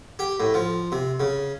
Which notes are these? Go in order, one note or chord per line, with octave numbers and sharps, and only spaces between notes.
G4
A2
F3
C3
C#3